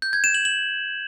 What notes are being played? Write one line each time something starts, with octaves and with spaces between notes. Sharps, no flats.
G6
G#6
E7
F#7
F#7